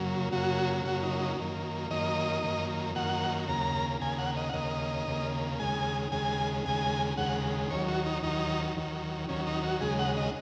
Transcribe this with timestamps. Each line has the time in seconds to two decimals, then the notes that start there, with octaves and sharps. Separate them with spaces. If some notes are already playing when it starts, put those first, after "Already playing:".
Already playing: F#2 C#3 F#3 A#3
0.31 F#2 C#3 F#3 A#3 F#4
0.85 F#2 C#3 F#3 A#3 F#4
1.03 D#4
1.19 D#4
1.37 F#2 D#3 A#3
1.90 F#2 D#3 A#3 D#5
2.42 F#2 D#3 A#3
2.95 F#2 D#3 A#3 F#5
3.48 D#2 C#3 A#3 A#5
4.01 D#2 C#3 A#3 G#5
4.19 F#5
4.36 D#5
4.49 F#5
4.53 D#2 C#3 A#3 D#5
5.07 D#2 C#3 A#3
5.59 D#2 C#3 G#3 G#5
6.12 D#2 C#3 G#3 G#5
6.65 D#2 C#3 G#3 G#5
7.17 D#2 C#3 G#3 F#5
7.70 D#2 D#3 F#3 C#5
7.88 F#4
8.06 D#4
8.23 D#2 D#3 F#3 D#4
8.76 D#2 D#3 F#3
9.29 D#2 D#3 F#3 C#4
9.47 D#4
9.64 F#4
9.81 D#2 C#3 G#3 G#4
9.99 F#5
10.17 D#5